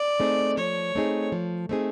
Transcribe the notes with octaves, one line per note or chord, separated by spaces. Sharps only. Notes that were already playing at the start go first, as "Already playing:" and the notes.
Already playing: D5
A3 C4 D#4 G#4
F3 C#5
A3 C4 D#4 G#4
F3
A3 C4 D#4 G#4